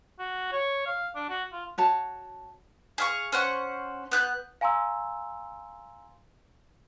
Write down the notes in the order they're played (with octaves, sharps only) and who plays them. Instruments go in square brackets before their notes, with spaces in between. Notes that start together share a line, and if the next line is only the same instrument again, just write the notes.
[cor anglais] F#4
C#5
F5
D4
F#4
F4
[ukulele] F#4 C#5 A5
[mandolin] G#4 F5 C#6
C#4 C5 F#5 C#6
B3 F#6 G6
[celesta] F5 G#5 A#5 C6 E6